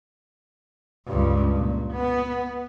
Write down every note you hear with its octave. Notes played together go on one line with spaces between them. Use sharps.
C#2 G2
A#2
B3